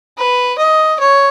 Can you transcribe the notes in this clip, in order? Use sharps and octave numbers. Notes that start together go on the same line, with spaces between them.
B4
D#5
C#5